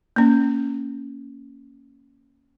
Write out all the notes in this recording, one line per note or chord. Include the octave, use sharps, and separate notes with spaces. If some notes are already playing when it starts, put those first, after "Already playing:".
A#3 C#4